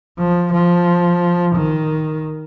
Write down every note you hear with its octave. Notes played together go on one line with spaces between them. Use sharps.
F3
F3
D#3